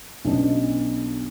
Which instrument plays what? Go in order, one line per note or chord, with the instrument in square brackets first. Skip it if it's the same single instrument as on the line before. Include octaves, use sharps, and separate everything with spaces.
[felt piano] B1 B3 C#4 D4 D#5